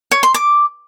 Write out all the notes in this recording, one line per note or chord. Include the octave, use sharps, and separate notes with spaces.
C#5
C6
D6